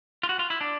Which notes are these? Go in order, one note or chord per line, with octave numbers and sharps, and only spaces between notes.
F4
F#4
F4
E4
D4